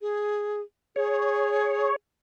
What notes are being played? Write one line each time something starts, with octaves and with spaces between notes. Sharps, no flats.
G#4
G#4 C#5